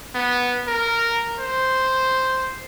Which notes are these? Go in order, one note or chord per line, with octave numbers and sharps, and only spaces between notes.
B3
A#4
C5